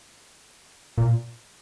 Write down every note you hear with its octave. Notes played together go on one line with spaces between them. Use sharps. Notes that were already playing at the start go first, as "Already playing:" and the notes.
A#2